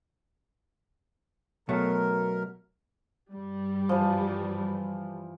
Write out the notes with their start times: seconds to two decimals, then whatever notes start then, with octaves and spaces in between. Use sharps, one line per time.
1.69 B2 F#3 A3 A#4
3.32 G2 G3
3.89 E3 F3